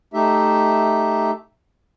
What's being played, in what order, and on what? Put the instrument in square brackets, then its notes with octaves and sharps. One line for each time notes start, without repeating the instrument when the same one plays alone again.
[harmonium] A3 D#4 G4 E5